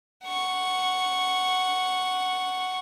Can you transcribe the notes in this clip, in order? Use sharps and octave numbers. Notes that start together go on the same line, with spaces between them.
F#5 C#6